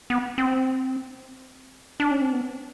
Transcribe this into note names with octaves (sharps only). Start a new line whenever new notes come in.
B3
C4
D4
C#4
C4
B3